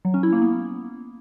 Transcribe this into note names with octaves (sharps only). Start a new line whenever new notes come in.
F#3
C#4
E4
A#3
B3